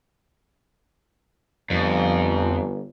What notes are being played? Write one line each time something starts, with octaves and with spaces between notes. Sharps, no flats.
G1 F2